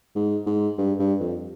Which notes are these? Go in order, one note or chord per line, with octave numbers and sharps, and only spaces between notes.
G#2
G#2
G2
G2
F2